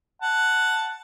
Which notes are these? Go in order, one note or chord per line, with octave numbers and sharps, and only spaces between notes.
F#5 A5